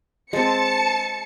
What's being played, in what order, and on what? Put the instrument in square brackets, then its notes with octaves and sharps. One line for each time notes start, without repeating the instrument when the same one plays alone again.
[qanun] G#3 C4 [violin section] A5 C#7